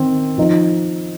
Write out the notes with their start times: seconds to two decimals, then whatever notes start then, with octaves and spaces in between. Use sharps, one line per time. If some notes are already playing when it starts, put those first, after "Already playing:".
Already playing: D#3 C4
0.38 F3 D#4